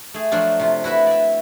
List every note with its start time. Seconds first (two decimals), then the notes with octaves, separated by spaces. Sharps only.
0.14 A3 G#4
0.32 F3 F#3 A3 D4 F4
0.60 C3 F4
0.84 E4 F#4 B4 E5
1.07 D5 E5